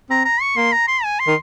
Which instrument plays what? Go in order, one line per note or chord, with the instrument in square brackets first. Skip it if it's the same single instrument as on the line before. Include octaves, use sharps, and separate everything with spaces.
[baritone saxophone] C4 [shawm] A#5
[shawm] A#5
C#6
[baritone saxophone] A#3 [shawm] C6
[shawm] A#5
C6
G#5
C6
[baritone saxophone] D#3